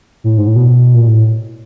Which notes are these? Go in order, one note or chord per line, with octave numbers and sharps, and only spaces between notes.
A2
G#2
A2
B2
A#2
A2